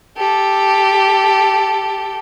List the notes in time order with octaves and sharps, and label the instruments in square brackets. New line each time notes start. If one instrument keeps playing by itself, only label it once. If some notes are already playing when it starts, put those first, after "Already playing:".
[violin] G4 A4